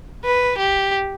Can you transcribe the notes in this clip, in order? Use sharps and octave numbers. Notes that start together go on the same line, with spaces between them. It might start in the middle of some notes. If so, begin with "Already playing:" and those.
B4
G4